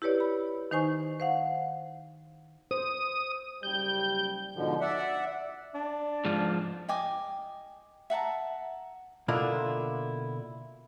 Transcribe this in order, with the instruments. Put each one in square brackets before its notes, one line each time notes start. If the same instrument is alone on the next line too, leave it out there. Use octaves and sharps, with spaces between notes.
[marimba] E4 G4 B4 C#5 D5
B5
D#3 D#4 C5 G#5 C#6
C5 F5 F#5
[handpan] C5 [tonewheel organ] D#6
[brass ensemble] F#1 G3 G5 [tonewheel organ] G6
[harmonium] G#2 B2 D3 F3
D5 E5 F#5
[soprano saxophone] D4
[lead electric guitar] G#2 F3
[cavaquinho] D#5 G5 G#5 D6
E5 F#5 A5 A#5
[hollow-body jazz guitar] B2 D3 A#3 D4 E4 F4